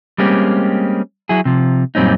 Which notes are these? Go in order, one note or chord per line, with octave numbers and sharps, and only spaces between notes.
G3 G#3 A#3 C4 C#4 G4
F#3 E4 G#4
C3 F3
F#2 A#2 G3 C4 C#4 D#4